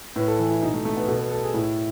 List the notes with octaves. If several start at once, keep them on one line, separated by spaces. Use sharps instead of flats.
A2 B4
A4
E3
E4
B2 D#4
A3
A3
B3
B2 A4
B4
A4
G#4
A2 E4